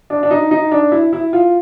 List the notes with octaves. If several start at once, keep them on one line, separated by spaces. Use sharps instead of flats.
D4
D4
D#4
D#4
D4
E4
E4
F4